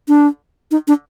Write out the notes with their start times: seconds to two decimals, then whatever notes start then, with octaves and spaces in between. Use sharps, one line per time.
0.08 D4
0.71 D#4
0.88 D4